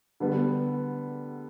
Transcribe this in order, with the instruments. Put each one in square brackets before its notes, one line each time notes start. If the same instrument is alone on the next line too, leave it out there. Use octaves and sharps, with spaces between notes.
[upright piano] D3 G3 B3